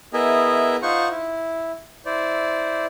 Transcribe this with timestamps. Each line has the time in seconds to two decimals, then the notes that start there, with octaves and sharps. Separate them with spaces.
0.13 B3 E4 G#4 A#4 D#5 E5
0.82 D#4 F4 C5 F#5 C#6
1.11 E4
2.06 E4 C5 D5